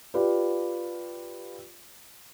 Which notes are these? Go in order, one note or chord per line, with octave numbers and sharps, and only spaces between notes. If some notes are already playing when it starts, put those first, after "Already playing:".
F4 G4 B4 D5